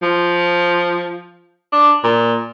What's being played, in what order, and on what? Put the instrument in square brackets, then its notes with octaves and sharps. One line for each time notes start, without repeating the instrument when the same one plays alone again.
[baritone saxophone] F3
D4
A#2